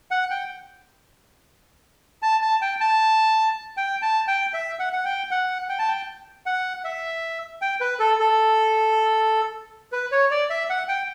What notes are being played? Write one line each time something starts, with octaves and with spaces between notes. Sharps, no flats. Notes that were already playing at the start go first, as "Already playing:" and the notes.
F#5
G5
A5
A5
G5
A5
G5
A5
G5
E5
F#5
F#5
G5
F#5
G5
A5
G5
F#5
E5
G5
B4
A4
A4
B4
C#5
D5
E5
F#5
G5